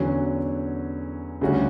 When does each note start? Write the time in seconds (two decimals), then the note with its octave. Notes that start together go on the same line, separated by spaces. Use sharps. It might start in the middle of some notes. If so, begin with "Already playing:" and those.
Already playing: E2 D3 F#3 C#4
1.41 D2 C#3 G3 C#4 F#4